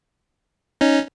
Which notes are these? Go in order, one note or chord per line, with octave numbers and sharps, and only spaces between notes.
C#4 D#4